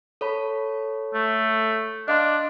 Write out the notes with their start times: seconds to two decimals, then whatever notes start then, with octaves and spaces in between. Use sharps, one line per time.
0.21 A4 C#5 B5
1.14 A3
2.08 D4 D#5 F5 C6